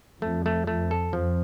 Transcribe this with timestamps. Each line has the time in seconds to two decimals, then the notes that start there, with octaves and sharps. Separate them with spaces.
0.22 F2 A3
0.46 A3
0.67 F2 A3
0.91 A4
1.13 F2 F3